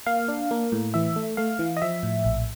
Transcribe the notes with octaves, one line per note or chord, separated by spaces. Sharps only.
A#3 F5
D4
A#3
A2
E3 E5
A3
A3 F5
E3
D#5
F3 E5
A2
A#1